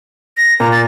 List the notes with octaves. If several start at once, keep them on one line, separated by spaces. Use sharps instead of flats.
A#6
A#2 A#5
A6